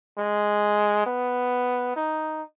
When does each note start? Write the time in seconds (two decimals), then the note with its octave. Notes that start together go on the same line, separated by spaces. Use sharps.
0.18 G#3
1.07 B3
1.96 D#4